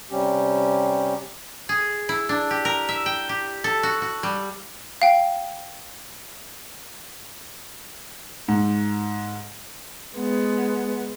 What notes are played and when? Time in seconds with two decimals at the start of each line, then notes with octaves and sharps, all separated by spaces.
0.11 C3 G3 C#4 G4
1.69 G#4
2.09 E4
2.29 D4
2.51 G4
2.65 A#4
2.89 E5
3.06 G5
3.29 G4
3.64 A4
3.83 F#4
4.02 F#4
4.23 G3
5.02 F5 G5
8.48 G#2
10.16 G#3 B3